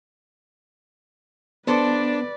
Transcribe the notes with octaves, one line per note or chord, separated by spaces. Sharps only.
B3 D4 A4 B4 C5 D5